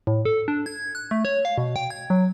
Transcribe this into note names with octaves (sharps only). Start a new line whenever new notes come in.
A2
A4
D4
G#6
F#6
A3
C#5
F5
B2
G5
G#6
F#3